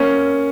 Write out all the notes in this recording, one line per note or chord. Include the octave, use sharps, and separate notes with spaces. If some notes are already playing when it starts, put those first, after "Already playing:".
Already playing: A#3 C#4